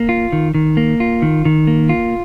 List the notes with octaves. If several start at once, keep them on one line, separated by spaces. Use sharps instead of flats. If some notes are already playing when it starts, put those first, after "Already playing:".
Already playing: A#3
F4
D#3
D#3
A#3
F4
D#3
D#3
A#3
F4